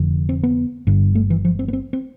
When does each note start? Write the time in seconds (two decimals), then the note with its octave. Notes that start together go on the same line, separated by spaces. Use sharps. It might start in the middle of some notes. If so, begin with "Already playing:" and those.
Already playing: F1 F2 D3
0.29 C4
0.43 B3
0.87 G1 G2 D3
1.15 A3
1.30 E3
1.45 F3
1.59 C4
1.68 B3
1.73 C4
1.93 C4